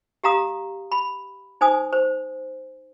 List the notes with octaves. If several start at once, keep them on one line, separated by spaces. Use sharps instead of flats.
G4 F5 A#5 D#6
B5
D#4 C5 G#5 D#6
C5